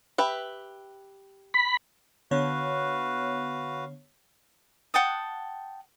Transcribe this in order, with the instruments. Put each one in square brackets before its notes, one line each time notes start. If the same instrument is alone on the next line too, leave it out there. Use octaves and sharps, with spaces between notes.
[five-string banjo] G4 B4 E5
[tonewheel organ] B5
[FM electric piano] D3 B3 C#5 [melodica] F#4 B4 F5
[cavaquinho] F#5 G5 A5 D#6